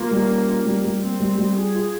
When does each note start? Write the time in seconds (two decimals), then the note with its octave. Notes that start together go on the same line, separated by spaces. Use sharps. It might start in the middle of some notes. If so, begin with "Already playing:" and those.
Already playing: A#3 F4
0.11 G3
0.30 C#4
0.48 F4
0.66 G3
0.85 G3
1.02 A#3 C4
1.20 G3
1.38 G3
1.57 F4 G#4
1.75 F4